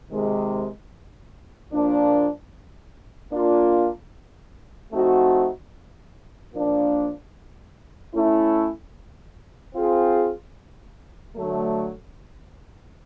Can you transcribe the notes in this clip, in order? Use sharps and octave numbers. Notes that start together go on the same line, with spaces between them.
C3 D#3 G#3
A#2 F3 A#3 D4
A#3 D4 F4
F3 A3 C4 D#4 F#4
A#2 F3 A#3 D4
A3 C#4 E4
C4 F4 G#4
D3 F#3 A3